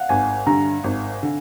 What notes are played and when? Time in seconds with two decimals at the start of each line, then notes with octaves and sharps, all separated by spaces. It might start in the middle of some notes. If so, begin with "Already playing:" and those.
Already playing: F5 F#5
0.09 G#1 G#5
0.46 G2 D3 A#5
0.84 G#1
1.23 D3